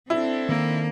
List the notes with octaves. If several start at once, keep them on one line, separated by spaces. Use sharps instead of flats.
C4 D4 E4 A4
D#3 A#3 A#4